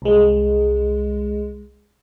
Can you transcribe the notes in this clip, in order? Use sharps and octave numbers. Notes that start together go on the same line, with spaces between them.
C2 G#3